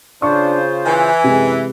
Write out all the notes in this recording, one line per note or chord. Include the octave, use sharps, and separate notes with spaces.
C#3 D4 F4 C5 C#6
E3 G#5
F#2 C3 G#3